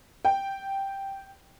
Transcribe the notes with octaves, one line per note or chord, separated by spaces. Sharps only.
G5